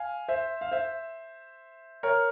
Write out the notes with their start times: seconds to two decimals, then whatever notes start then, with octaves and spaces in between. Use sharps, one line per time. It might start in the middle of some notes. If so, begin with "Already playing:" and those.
Already playing: F5 G#5
0.28 C5 E5
0.61 F5
0.72 C5 E5
2.03 A#4 C#5